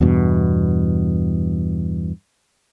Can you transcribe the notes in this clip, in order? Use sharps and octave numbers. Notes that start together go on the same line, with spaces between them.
E2 G2 B2